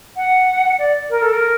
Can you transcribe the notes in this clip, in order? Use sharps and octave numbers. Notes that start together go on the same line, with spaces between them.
F#5
D5
A#4
A4
A#4